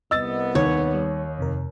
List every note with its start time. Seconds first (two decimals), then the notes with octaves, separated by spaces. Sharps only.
0.11 C2 B3 D#5 E6 A6
0.55 D#2 C#5
0.94 G3
1.38 F2 C3 A#4